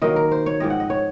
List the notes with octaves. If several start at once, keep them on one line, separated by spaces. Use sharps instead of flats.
D#3 F#3 A#3 D#5
A#4
C5
C#5
G#2 F3 C4 D#5
F#5
D#5
C#5